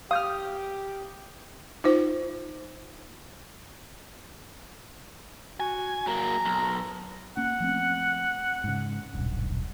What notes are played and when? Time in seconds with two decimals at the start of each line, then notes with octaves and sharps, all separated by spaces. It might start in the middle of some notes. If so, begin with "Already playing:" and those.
0.11 G4 F5 D#6 F6 G6
1.84 D#4 F4 C5
5.60 F#4 G#5
6.07 F#3 A#3 A#5
6.45 B1
7.37 A#3 C#4 F#5
7.60 F3 A3 C4
8.64 G#2 C#3
9.14 D#1 B1 G2